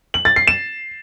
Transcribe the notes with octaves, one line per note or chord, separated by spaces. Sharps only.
F#7
A6
C7
E7